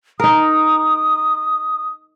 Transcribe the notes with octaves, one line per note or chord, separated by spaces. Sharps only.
D#4 A#4 D#6